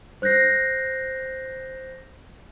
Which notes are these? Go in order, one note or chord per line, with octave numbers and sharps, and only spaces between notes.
C5 F#6 G6 A#6 C7